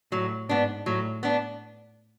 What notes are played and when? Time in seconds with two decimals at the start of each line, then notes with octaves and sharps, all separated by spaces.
0.12 A2 F#3
0.49 G#2 B3 D4
0.86 A2 F#3
1.23 B3 D4